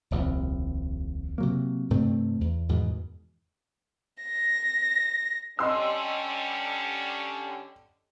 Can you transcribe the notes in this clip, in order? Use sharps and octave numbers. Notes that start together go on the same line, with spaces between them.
D#1 C2 F3
C3 F#3 A#3
G2 C3 A3 C4
E2
E2 G#2 B2 D#3
A#6
D3 G3 C#4 D#5 C6 E6